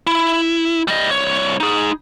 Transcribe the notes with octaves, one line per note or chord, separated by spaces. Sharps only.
E4
G3 D#5
C2 C#5
D#4 G#4